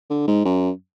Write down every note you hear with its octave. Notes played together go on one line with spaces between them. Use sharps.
D3
G#2
F#2